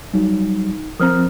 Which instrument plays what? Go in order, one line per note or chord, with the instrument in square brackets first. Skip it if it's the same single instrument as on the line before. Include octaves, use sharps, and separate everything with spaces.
[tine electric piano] F#3 G3 [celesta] D#4
[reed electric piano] F3 C4 [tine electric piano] A#4 C5 A#5 [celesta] D#6 F6